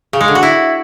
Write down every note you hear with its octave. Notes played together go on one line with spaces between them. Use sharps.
C#3
G#3
D3
F#4
E4